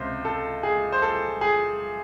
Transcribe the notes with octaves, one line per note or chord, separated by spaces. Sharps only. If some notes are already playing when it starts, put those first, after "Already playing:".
Already playing: C#2 C3 C5
A4
G#4
C5
A4
G#4